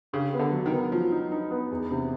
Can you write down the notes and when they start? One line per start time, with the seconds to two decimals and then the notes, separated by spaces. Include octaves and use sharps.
0.13 C#3 G4
0.34 B3
0.39 D3
0.52 F#3
0.66 D#3
0.72 B3
0.91 F3 F#3
1.11 D#4
1.31 D#4
1.51 B3
1.71 E2
1.91 C3